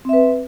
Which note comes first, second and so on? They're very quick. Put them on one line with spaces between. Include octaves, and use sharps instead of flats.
C4 E5 B4